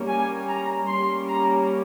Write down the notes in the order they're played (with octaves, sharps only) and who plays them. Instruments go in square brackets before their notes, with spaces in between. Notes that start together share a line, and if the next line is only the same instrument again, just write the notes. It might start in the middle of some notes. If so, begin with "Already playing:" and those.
Already playing: [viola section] G3 A#3 C#4
G#5
A#5
G3 A#3 C#4 C6
A#5